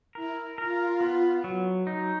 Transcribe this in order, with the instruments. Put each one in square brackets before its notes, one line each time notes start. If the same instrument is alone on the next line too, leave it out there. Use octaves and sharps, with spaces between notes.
[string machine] E4 [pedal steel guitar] A#4
[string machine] F4 [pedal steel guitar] A#4
[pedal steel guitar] B3
F#3
D#4